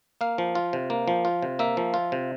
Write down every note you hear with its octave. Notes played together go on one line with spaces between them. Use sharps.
A#3 F5
F3
F4
C3
A#3
F3
F4
C3
A#3 E5
F3
F4
C3